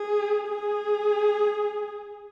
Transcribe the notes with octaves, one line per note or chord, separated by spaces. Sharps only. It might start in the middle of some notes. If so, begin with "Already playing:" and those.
Already playing: G#4
G#4